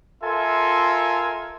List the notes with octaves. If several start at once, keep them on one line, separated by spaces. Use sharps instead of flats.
F4 A4 A#4 E5 G#5 C6